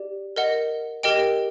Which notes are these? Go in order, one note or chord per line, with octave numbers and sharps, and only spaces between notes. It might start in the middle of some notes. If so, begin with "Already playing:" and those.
Already playing: G4 D5
A#4 D#5 F#5
G4 A#4 D#5 G5 D7